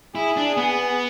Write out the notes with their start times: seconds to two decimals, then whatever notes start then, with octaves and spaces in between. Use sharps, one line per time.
0.15 E4 G#4
0.37 D4
0.57 B3